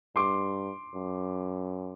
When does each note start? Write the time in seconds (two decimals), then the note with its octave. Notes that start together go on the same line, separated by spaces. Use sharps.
0.16 G2 C6 D6
0.94 F#2